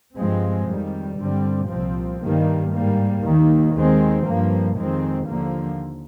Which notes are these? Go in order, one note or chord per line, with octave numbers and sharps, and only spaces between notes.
G2 F3 G#3 C4
F2 D#3 G3
G2 D3 G3 C4
C2 A#2 F3 C4
G2 D#3 G3 A#3
G#2 G3 A#3
D#2 D#3 A#3
D#2 D#3 G#3 C4
G2 F3 A#3
F2 D#3 G#3 C4
D#2 D3 F3 A#3